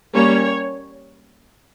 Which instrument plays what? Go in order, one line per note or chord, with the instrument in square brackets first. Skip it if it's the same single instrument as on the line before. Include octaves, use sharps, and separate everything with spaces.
[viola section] G3 A#3 C#4 C#5